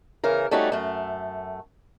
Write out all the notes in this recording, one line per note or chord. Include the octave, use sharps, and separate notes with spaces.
C#3 E3 A#4
G3 A3 C#4 D#4 F#4
F#2 A3